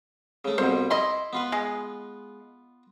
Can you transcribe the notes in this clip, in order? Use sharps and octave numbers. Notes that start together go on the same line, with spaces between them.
C#3 A3
C2 F2 B2 C5
E4 D#5 C6
B3 F4 B4
G#3